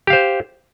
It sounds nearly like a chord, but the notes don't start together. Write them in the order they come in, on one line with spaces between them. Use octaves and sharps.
G4 F5 C5